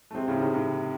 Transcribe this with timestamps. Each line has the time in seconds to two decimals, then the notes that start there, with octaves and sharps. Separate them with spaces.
0.11 A3
0.15 C3 G#3 C4
0.28 A2 C#3
0.36 D#3
0.41 A2 C#3
0.53 A2 C#3